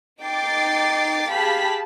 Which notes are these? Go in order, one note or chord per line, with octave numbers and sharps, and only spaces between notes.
D#4 G5 D6 A6 C7
G4 G#4 F5 A5 B5 B6